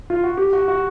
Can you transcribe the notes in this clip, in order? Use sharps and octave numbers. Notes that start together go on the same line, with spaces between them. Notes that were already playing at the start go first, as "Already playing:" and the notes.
F4
F#4
G4
F#4
F#4